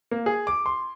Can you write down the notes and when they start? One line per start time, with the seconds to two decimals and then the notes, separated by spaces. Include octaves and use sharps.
0.11 A#3
0.26 G#4
0.47 D6
0.66 C6